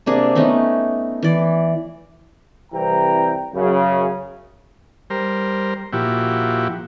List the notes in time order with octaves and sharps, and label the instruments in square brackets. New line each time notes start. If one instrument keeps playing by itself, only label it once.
[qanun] C3 A#3 D4 G#4
A3 B3 C#4 D#4
E3 D5
[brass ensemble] C2 E3 G5 A#5
F#2 C#3
[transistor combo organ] G3 A#4 C5
A#2 F3 E4 F#4 G4